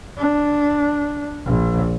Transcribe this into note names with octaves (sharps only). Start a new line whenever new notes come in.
D4
A#1